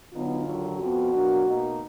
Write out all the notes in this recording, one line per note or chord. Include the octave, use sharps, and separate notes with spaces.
D2 D3 F#3 B3 D#4 F4
D#2 D3 F#3
F2 F3 B3 F#4
B2 F#3 A#3 D4
B2 A#3 D#4